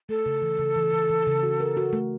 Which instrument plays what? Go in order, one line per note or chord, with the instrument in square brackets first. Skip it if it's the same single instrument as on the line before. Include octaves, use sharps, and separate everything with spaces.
[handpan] A3 [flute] A4
[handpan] C#3
E3
C#3
E3
E3
E3
C#3
F#4
A#4
F#4
A3